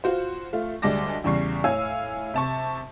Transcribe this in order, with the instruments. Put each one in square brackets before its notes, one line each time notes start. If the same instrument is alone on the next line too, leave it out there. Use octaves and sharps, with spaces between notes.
[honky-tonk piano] F4 F#4 C5
A3 F4
D2 G3 G#3 A5 D6 A#6
E2 C#3 G3 C#6 C7
A2 C#5 F5 G#5 E6
C3 A5 C#6